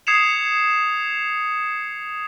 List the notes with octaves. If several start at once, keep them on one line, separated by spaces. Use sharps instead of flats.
D#6 G#6 C7 C#7 E7 F7